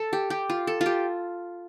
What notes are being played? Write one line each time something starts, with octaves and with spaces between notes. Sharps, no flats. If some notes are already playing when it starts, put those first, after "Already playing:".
Already playing: A4
G4
G4
F4
A4
F4
G4